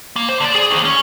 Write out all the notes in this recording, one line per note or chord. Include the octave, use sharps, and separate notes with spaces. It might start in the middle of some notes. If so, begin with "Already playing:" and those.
A#3
C5
D3 D5
G#4
D#2
C#4